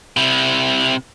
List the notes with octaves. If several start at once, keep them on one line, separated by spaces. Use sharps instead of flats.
C3 E4